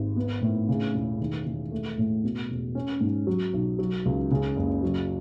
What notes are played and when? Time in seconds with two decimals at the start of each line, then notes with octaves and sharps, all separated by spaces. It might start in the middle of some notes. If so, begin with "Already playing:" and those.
Already playing: G#1
0.16 B3
0.42 A2
0.69 C#3
0.94 E1
1.20 D#3
1.46 E1
1.71 A3
1.98 A2
2.24 B2
2.50 E1
2.75 C#4
3.01 G#2
3.27 F#3
3.53 B1
3.79 F#3
4.05 C#2
4.31 C#3
4.57 F#1
4.83 F#3